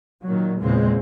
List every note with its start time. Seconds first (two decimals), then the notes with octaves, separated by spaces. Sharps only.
0.24 A#2 D#3 F#3
0.62 E2 A#2 C#3 E3 G#3 C4